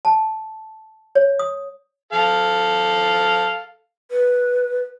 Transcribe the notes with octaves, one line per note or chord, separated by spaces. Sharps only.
A5
C#5
D#6
A4 F5
B4